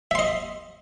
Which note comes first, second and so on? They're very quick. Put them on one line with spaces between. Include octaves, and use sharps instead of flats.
E5 C6 D#5